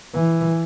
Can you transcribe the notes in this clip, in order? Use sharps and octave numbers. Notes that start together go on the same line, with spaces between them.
E3